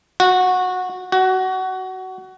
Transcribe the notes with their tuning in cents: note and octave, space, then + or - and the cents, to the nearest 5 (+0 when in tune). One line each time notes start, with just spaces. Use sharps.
F#4 -15
F#4 +20